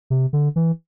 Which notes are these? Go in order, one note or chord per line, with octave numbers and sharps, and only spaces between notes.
C3
D3
E3